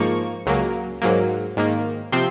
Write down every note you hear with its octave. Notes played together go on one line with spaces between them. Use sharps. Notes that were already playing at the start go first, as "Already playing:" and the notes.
Already playing: G#2 F3 A#3 C#6
C#2 C#3 F#3 A#3
G#2 F#3 A#3
G#2 D#3 A#3
C3 F3 C4 C6